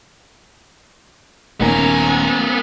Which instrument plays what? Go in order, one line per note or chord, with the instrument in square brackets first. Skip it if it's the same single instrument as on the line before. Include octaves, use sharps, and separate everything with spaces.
[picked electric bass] D#1 D#2 A#3 [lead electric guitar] B3 A#4 [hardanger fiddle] C#4 G#5